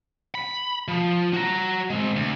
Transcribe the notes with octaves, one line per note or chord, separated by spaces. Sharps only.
B5
F3
F#4 A#5
G#3 C4
D2